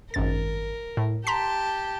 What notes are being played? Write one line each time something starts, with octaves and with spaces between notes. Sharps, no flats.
G#1 F#2 A#4 A6
A2
G4 A5 A#5 C6 B6